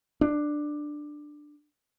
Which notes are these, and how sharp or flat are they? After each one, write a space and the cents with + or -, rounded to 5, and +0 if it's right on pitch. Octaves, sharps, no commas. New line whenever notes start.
D4 +10